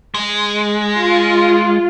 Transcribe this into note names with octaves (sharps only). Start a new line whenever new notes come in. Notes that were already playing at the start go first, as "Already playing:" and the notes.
G#3
F4